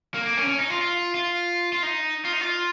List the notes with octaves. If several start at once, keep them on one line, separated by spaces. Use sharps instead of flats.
A#3
A#3
C#4
C#4
D#4
F4
F4
F4
F4
D#4
F4
D#4
F4